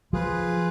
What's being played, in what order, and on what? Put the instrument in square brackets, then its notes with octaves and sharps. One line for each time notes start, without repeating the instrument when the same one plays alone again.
[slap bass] F3 [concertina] F4 G#4 B4